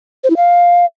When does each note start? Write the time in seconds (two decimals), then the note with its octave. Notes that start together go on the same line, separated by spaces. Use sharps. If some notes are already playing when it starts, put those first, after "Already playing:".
0.24 C5
0.30 E4
0.37 F5